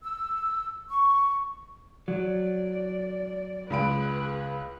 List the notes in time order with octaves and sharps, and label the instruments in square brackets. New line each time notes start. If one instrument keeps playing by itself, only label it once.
[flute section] E6
C#6
[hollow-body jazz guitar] F#3 [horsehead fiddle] D5
[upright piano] C#2 B5 D7 [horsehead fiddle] G#4 B4